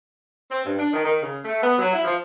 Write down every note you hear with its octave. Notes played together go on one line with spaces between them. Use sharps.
C4
G2
D4
D#3
D#3
C#3
A3
B3
F#3
E4
F3